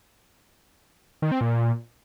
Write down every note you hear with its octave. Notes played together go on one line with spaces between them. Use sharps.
D#3
C4
A#2